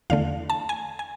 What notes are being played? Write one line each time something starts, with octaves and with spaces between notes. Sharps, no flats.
E2 D3 A3 F5
A5
G#5
G#5